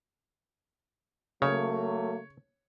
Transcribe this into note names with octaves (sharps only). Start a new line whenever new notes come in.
C#3 F#3 A3 A#3 C#5